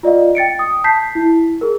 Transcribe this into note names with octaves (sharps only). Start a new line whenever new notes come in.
F4 D5 D#5 F5
G5 A6 C#7 D7
D#6
A5 G6 B6 C7
E4
G#4 A#4